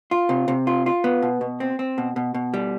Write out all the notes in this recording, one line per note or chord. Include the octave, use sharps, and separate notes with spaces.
F4
C3
C3
F4
F4
B3
B2
B2
C4
C4
B2
B2
B2
G3